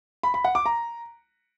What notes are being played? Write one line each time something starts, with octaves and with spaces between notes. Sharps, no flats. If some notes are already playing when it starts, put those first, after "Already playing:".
B5
B5
F#5
D6
A#5